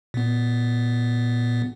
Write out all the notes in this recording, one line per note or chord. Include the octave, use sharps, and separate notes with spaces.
A#2 B3